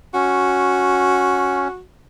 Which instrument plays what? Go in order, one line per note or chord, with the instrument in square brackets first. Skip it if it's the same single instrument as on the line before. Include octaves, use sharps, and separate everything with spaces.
[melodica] C#4 [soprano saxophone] F#4